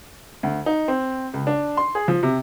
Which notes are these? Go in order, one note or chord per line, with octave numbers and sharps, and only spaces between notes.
D2
D#4
C4
C#2
D4
C6
G#4
F3
C3